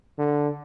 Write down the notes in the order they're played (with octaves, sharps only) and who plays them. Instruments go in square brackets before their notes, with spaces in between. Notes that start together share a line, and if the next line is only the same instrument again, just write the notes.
[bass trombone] D3